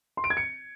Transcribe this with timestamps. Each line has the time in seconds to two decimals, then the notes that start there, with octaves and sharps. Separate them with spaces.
0.17 C6
0.24 D7
0.30 G#6
0.37 C#7